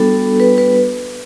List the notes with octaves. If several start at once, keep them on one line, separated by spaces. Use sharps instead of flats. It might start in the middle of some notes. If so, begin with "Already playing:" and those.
Already playing: G3 B3 D4 F#4 A4
B4
B4